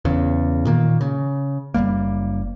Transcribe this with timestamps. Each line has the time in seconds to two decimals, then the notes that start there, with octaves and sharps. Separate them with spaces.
0.05 E2 C#3
0.65 A#2 D#3 A#3
1.01 C#3
1.74 F#1 E2 G3 A#3